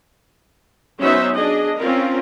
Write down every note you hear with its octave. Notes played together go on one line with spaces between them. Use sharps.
F#3 B3 C#4 D#4 C5 E5
D4 G#4 D#5
C4 C#4 F4 A#4